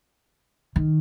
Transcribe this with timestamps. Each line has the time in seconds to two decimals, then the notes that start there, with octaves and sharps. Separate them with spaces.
0.76 D#3